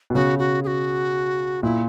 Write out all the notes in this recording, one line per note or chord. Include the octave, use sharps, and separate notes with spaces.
B2
C#3 F#4
F#4
G#4
F#4
A#2 E4